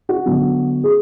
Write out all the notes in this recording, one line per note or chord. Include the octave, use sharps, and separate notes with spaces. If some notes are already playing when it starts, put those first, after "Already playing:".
F#4
D3 F#3 B3
G#4